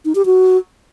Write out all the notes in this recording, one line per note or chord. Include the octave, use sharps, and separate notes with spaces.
D#4
G4
F#4